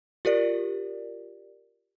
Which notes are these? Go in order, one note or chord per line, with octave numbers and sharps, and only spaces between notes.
F4 G4 A#4 D5